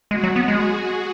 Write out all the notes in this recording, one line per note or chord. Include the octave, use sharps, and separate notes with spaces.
G#3 F#4
F#3
B3
G#3 G#4